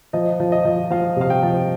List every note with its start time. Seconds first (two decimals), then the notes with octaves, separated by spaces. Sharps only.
0.13 F3 D#5
0.40 F3
0.52 D#5
0.65 F3
0.90 F3 F5
1.16 C3 F5
1.30 G5
1.43 F3